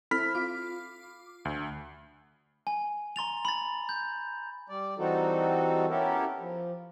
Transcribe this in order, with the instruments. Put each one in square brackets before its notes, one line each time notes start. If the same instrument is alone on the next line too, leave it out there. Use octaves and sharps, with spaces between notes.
[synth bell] C4 E4 A4 [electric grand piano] B5 F6 B6
[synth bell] F4 D6
[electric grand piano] D2
[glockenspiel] G#5
A#5 C6 A6 F7
B5 A6
G6
[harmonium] G3 D5
E3 G3 C4 D#4 F#4 A4
B3 C#4 E4 G4 A4 A#4
F3